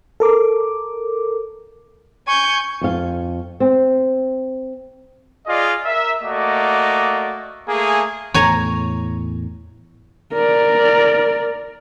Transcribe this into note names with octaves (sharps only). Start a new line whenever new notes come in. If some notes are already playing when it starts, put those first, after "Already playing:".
A4 A#4 D6
G#5 C#6 G6
F2 F5
C4
F4 G#4 D5 D#5
A#4 E5
A3 A#3 F#4 D5 D#5
A3 A#3 G#4
E2 A2 C#5 G#5 A#5
A#4 D5